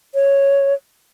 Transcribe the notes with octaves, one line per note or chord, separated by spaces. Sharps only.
C#5